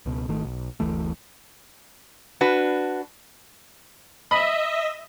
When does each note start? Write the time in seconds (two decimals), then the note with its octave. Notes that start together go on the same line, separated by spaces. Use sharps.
0.06 C#2 B2
0.28 G#1 D#3 A3
0.44 B1
0.80 F#1 D2 E3 A3
2.41 D4 F#4 B4
4.31 D#5 E5 B5